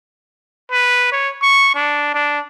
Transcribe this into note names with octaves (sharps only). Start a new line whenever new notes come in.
B4
C#5
C#6
D4
D4